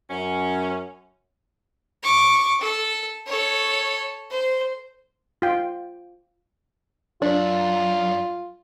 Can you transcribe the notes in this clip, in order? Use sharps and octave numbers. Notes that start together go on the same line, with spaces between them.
F#2 C#4
C#6 D6
A4
A4 C#5
C5
F4 G5
F#2 D4 F4